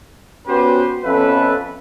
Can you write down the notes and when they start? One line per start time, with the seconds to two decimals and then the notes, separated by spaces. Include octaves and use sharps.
0.47 B3 C#4 F#4 G4 B4 C5
1.04 F2 B3 C#4 A4 B4 E5